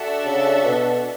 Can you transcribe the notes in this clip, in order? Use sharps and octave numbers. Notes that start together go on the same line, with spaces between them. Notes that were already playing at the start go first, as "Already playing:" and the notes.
Already playing: D4 F#4 A4 E5
C#3
B2